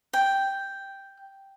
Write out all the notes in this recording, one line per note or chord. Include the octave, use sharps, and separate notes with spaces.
G5